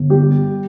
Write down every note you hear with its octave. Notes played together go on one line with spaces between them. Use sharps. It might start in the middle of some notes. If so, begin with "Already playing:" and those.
Already playing: G1
G3 G4